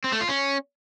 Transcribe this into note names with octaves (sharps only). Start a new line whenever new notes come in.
C4
A3
F4
C#4